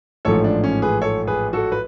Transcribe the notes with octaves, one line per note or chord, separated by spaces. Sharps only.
A1 G#2 F3 A3 A4 C#5
D4
C#4
G#4 B4
A4 C#5
G#4 B4
F#4 A4
B4